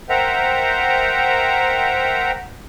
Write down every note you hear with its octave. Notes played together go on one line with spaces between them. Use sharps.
A#4 C5 E5 F#5 G5 A#5